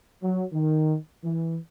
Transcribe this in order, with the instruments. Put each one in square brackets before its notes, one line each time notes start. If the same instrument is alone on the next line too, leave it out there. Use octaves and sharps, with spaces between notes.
[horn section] F#3
D#3
E3